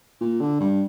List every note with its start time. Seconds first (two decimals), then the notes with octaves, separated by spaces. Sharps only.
0.21 A#2
0.41 D3
0.60 G2